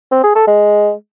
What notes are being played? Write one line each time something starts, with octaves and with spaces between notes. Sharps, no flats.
C4
G#4
A4
G#3